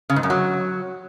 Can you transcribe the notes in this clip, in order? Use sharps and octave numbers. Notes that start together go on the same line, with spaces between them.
C#3
G#2
F#2
F#3